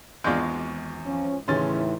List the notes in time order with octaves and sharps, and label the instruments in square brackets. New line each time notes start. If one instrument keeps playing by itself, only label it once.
[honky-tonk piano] G#1 C#6 A#6 [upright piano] E2 G6 [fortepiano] G#3 D4 F4
[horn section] F3 C#4
[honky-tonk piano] D#2 C6 [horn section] A2 E3 [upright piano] C#3 C#4 A6